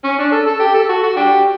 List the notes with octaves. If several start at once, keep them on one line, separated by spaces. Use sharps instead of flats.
C#4
D4
A4
A4
G4
A4
F#4
F#4
D4 G4